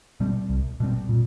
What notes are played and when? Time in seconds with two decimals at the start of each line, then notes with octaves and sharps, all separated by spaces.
0.20 B2 G3 C4
0.49 C2
0.80 B2 G3 C4
1.09 A#2